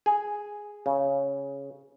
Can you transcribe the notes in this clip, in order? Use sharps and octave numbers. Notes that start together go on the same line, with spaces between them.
G#4
C#3